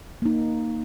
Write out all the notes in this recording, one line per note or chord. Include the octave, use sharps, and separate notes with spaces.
A#3 D#4